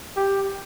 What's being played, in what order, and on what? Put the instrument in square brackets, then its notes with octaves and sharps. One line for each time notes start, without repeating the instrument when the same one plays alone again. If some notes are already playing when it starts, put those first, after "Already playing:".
[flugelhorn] G4